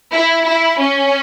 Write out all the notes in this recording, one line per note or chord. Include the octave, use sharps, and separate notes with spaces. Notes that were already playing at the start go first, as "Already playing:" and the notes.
E4
E4
C#4